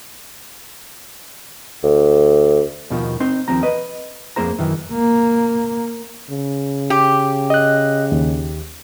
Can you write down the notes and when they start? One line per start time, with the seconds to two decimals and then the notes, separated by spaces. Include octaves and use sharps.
1.83 D2
2.90 D#2 B2 D#3 F3
3.20 C4 D#4 C6
3.48 D#2 F3 C4 A#5
3.63 B4 D#5
4.36 F2 B2 A#3 G#4 C5 A#5
4.59 F#2 D#3 E3
4.92 A#3
6.30 C#3
6.90 G4
7.50 D#5 F#6
8.12 D#2